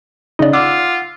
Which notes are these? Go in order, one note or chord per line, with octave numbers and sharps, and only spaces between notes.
C#3 D#4 D5 D#5
F4 F#5 D6 E6